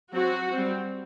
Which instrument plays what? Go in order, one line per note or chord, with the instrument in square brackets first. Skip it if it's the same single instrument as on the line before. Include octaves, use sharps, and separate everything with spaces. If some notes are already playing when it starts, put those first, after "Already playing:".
[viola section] F#3 C4 F#4
G3 C4